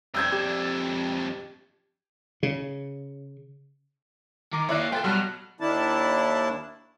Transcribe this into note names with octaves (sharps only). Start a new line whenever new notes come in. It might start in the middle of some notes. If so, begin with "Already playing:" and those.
F2 D4 E6 G6 G#6
G4
C#3
D#3 A#4 D6
A#3 E4 C#5 D5 F5 F#6
B3 F4 A4 G5
B1 F#3 G3 F#5 A5 F6
D#2 D#3 D4 E4 A5